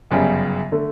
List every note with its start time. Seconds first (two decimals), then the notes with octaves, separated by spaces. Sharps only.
0.11 G1 F#2 C#3 G3
0.72 D3 A3